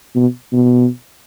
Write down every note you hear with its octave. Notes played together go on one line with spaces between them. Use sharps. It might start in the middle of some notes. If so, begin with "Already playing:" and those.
B2
B2